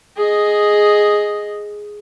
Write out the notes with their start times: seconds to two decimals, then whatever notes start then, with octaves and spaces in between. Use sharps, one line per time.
0.17 G#4 D#5